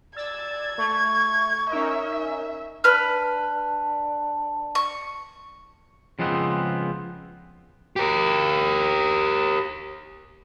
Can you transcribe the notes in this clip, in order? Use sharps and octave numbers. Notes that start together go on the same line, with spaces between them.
D5 E6 G#6 A6
A3 C#6
C#4 D#4 A#4 E5
D4 B4 F6
C#6
C#3 F3 G3 G#3 B3 C4
G4 A#4